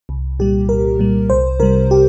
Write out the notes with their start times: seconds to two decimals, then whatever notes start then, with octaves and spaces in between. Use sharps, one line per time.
0.09 C2
0.39 A#2 G3 G4
0.69 C2 A#4
0.99 A#2 G3
1.30 C2 C5
1.60 C3 G3 A#4
1.91 G4